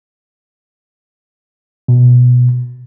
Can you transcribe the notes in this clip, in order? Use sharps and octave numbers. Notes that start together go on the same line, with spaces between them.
B2